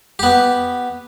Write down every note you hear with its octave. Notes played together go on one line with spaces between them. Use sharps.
B3 G4